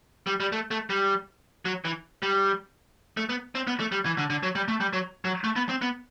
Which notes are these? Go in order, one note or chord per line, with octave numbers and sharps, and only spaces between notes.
G3
G3
A3
A3
G3
F#3
E3
G3
A3
B3
C4
B3
A3
G3
E3
D3
D3
F#3
G3
A3
G3
F#3
F#3
A3
B3
C4
B3